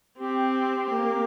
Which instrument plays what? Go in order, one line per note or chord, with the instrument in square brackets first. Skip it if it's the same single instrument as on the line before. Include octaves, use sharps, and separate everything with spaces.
[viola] C4 [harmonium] G4
[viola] A#3